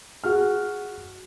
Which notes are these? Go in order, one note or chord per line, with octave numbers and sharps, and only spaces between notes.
F#4 G#4 F6